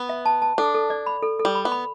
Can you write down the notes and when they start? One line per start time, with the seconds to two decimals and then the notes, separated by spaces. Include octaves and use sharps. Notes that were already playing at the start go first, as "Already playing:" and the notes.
Already playing: B3
0.09 E5
0.26 A5
0.42 A5
0.58 D4 A4
0.75 A4
0.90 D5
1.06 B5
1.23 A4
1.39 A4
1.45 G3
1.55 B5
1.65 B3
1.72 B5